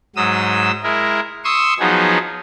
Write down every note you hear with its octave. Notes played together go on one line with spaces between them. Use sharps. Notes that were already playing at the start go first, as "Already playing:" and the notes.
G#2 F#3 D#6 E6
G#3 E4 A#4
C6 C#6 D#6 E6
F3 F#3 B3 D#4 G#4